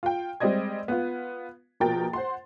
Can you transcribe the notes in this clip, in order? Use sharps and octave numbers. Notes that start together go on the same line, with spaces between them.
F4 G5
G3 G#3 C4 D5 D#5 G#6
B3 F4
A#1 B2 F3 A#4 G5 A6
C5 F#5 C6